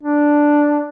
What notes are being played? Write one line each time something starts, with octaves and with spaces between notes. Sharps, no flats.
D4